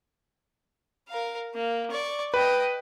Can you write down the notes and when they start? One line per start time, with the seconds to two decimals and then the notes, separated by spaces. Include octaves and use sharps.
1.09 A#4 F5
1.54 A#3
1.91 D5 C#6
2.34 B4 D#5 G5